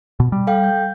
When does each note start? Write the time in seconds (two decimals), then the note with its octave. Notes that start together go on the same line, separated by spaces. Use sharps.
0.20 B2
0.32 G3
0.47 A4 F5 G5
0.64 G6